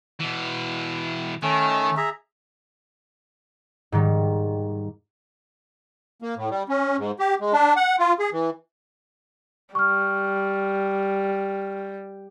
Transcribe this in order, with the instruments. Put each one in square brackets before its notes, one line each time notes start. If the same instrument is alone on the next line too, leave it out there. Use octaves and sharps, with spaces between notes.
[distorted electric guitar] B2 E3
[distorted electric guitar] D#3 [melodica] A3 C#4
[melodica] G#4 E5 A#5
[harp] G#2 D#3 G3
[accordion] A#3
A2
G3
C#4
G#2
G4
G#3
D4
F#5
F4
G#4
E3
[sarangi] G3 [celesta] C#6 F6